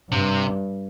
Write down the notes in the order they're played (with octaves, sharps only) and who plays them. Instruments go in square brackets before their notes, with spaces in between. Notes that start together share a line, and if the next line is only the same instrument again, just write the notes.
[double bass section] G2 [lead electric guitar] C3